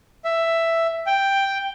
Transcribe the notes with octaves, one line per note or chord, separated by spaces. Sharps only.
E5
G5